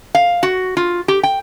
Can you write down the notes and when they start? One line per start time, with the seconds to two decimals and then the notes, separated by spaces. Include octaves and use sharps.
0.15 F5
0.43 F#4
0.77 F4
1.08 G4
1.23 G5